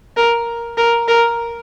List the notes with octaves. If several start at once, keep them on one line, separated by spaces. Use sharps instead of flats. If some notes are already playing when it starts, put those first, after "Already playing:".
A#4
A#4
A#4